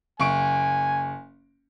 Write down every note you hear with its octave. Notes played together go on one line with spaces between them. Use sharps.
F#1 G#5 C#6 D7